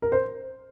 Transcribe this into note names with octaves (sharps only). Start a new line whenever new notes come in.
A#4
C5